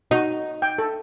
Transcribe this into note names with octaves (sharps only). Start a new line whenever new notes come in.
D#4 F#4
G5
A4